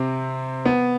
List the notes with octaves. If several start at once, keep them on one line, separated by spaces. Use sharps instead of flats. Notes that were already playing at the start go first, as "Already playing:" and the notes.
Already playing: C3 C4
B3